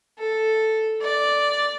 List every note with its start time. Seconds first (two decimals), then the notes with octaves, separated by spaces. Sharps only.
0.19 A4
1.02 D5